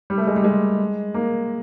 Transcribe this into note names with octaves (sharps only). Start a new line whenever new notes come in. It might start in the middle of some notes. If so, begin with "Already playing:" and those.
G3
A3
G#3
G3
G#3
A#3